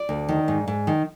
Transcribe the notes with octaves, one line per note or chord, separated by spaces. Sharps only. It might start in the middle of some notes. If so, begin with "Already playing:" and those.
Already playing: D5
D2
D#3
G#2
G#2
D#3